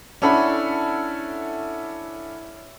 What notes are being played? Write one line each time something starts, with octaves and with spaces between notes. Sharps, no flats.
C#4 D4 E4 A4 F#5 B5